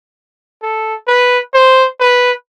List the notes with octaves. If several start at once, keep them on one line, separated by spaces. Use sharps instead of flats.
A4
B4
C5
B4